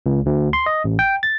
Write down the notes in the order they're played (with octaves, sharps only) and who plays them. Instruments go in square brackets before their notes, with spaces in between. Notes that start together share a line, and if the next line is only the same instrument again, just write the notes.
[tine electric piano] C#2
D2
C6
D#5
A1
G5
A6